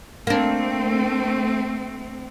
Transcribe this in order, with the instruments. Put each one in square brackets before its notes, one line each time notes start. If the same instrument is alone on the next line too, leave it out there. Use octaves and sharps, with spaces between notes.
[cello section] A3 C4 [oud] A#3 D4